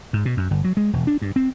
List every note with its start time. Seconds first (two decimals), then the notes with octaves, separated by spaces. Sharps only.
0.13 G#2
0.25 B2
0.37 F#2
0.51 G1
0.64 F#3
0.77 G#3
0.93 E1
1.07 D4
1.22 G2
1.36 C4